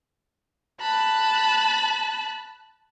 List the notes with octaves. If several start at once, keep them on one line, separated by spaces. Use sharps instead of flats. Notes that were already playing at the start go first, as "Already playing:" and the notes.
A5 B5 F#6